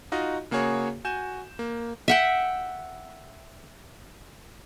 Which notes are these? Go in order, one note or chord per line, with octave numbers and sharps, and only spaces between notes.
D#4 F4 F#4 D#5
C#3 A#3 F#4 G#4 C#5
F#4 G#5 G6 E7
A#3
E5 F#5 G5